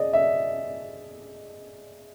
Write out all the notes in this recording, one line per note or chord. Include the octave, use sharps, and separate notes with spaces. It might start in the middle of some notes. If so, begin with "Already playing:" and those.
Already playing: G#4 D5 D#5
E5